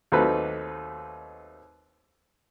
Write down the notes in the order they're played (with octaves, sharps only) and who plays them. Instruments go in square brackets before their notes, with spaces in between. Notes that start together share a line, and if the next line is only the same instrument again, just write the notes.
[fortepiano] D#2 F#3 A3 C4 D#4 B4